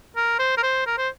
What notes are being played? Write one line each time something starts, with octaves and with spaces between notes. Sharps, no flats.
A#4
C5
A#4
C5
A#4
C5